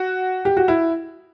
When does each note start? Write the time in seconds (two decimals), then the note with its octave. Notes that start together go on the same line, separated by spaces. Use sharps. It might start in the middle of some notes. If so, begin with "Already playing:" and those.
Already playing: F#4
0.45 G4
0.57 F#4
0.68 E4